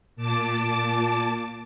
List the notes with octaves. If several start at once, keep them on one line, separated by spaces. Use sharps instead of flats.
A#2 A5 D6